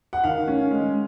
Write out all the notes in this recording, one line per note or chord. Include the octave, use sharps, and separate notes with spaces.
F#5
D#3 F5
C#4
G#3